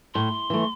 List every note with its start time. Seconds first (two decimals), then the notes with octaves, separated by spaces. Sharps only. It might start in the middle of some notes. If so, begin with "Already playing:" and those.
0.14 A2 C6
0.50 E3 A3